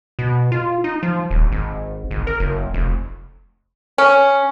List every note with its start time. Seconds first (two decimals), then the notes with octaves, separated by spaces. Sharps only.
0.19 B2
0.52 F4
0.84 D#4
1.03 F3
1.31 D#1
1.52 G#1
2.11 G#1
2.27 A#4
2.40 F#1
2.74 F1
3.98 C#4